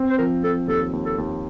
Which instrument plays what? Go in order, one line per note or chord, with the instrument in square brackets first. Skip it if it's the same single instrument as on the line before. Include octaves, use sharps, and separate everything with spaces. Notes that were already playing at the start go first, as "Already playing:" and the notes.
Already playing: [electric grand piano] C4
[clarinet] C5
[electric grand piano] F3 [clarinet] A#4
[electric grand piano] C4 [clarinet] A4
[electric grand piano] D#2 [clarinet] A4
[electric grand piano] D#2
[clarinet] A4
[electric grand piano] D#2